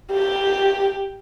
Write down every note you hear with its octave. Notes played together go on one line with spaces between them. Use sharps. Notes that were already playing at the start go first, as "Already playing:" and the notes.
G4